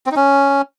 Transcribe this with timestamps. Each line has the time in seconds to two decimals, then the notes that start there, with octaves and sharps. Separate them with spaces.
0.06 C4
0.11 D#4
0.16 C#4